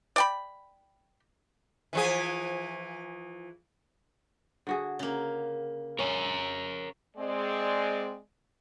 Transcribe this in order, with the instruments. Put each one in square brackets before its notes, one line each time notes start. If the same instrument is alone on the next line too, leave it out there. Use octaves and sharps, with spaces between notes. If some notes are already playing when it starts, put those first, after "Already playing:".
[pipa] D5 G5 B5
[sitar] E3 F3 G#4
[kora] D3 F#4 G#4
[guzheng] C#3 A#3
[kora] C#4 [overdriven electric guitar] A#4 C#5
[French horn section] G#3 C4 D5